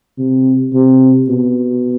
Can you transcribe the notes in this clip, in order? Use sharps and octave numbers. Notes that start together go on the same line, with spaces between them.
C3
C3
B2